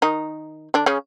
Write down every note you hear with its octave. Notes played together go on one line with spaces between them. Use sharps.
D#3 D#4
D3 D4
C#3 C#4